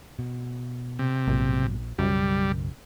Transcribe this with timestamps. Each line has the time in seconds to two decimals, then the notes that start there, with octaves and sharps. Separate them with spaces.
0.19 B2
0.99 C3
1.28 A#1 G#2 B2 F#3
1.98 B1 F#2 C#3 G3